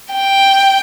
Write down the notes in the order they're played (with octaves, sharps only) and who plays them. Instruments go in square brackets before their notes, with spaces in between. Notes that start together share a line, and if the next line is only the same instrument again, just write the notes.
[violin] G5